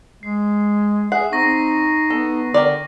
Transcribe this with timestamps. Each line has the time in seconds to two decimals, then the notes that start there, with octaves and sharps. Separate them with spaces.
0.23 G#3 C7
1.12 G#4 E5 F#5 C7
1.32 C4 D#4 C#6 A#6
2.10 B3 A4
2.54 D3 G4 A#4 D5